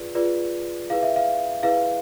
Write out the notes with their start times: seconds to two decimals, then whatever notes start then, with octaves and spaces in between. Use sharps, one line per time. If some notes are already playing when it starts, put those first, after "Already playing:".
Already playing: F4 G#4 B4 D5
0.15 F4 G#4 B4 D5
0.90 E4 G#4 B4 F5
1.03 E5
1.16 F5
1.63 E4 G#4 B4 F5